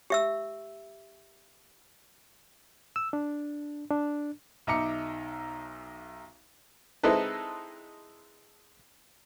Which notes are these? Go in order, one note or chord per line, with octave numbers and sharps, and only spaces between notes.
G4 E5 E6
E6
D4
D4
B1 D#4 E5 A#5 D6 C#7
G#3 C4 D#4 E4 A4 B4